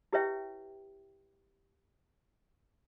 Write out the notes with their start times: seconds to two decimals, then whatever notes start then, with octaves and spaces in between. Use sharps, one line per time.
0.13 E4 G4 B4 C#5 E5 G5